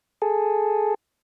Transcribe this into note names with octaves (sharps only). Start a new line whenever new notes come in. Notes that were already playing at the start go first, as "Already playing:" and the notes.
G#4 A4